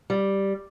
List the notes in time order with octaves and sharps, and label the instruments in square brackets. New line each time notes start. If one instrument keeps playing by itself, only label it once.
[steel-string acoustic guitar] G3